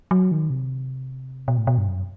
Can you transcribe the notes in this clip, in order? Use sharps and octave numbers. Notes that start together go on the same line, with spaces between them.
F#3
D#3
C3
B2
A2
B2
G2
F#2